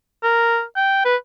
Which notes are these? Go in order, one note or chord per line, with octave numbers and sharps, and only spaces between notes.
A#4
G5
B4